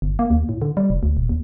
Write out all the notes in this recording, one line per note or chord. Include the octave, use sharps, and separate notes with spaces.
G1
A#3
D#2
A2
D3
G3
F1
D2
D#1
D#2